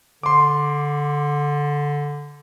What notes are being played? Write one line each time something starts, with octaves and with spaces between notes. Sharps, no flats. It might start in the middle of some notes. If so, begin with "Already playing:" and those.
D3 C6 D6